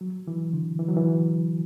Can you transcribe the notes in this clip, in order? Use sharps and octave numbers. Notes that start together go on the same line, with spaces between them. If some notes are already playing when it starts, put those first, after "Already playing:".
F#3
E3
D3
E3
F#3
E3